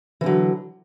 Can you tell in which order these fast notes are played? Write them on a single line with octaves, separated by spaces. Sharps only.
E3 D3 F#3